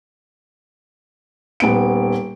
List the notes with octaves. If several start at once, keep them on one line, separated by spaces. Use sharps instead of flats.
D#1 B3 D7